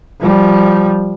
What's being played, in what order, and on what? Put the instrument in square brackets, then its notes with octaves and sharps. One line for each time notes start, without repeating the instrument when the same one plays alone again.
[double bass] F3 G3